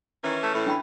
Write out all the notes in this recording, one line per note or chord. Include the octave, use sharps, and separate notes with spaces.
D#3 E3 C#4
A3
A2
D4 G5 B5